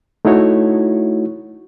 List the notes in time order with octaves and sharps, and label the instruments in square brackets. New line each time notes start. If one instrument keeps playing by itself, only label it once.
[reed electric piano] A3 D#4 E4 F#4 C#5